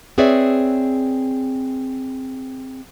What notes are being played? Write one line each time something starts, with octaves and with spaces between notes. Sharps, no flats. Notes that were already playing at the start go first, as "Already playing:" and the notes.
C4 G#4 B4 C#5 D5 E5